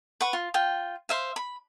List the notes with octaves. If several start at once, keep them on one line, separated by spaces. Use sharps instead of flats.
B4 F#5 C#6
F4
F4 G5
C5 E5 F5
B5